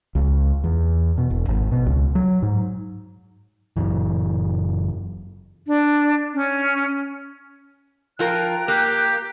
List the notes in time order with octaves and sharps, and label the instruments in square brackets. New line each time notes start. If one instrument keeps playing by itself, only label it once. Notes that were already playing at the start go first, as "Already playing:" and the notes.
[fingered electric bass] C#2
E2
B2
E1
G#1
B2
C#2
F#3
G#2
[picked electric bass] F#1 F#2 E3
[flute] D4
C#4
[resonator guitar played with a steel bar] F3 F4 A#4 [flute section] G5 A#5 F#6
[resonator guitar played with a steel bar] A#3 [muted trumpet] G4